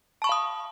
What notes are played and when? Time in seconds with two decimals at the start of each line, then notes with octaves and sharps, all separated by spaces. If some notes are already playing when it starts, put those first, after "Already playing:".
0.22 A5
0.24 C#6
0.27 B5
0.29 F5
0.32 D#6